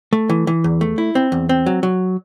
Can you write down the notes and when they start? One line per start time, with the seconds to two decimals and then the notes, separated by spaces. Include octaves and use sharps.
0.13 A3
0.30 E3
0.47 E3
0.64 E2
0.81 A3
0.98 E4
1.15 C4
1.32 E2
1.49 C4
1.66 F#3
1.83 F#3